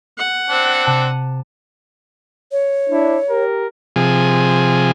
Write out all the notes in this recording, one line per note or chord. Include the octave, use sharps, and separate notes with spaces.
F#5
C4 D4
C3 A5 D#7
C#5
D4 E4
G4 A#4
C3 F3 G#4